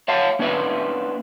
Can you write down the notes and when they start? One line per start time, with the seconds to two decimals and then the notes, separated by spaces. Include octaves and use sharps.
0.08 C#5 E5 F5 A5
0.39 A#3 C#4 D4 B4 E5